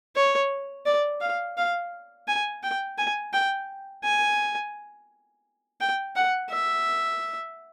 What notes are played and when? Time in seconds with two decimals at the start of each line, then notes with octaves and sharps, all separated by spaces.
0.16 C#5
0.86 D5
1.21 F5
1.58 F5
2.28 G#5
2.63 G5
2.98 G#5
3.33 G5
4.04 G#5
5.81 G5
6.16 F#5
6.52 E5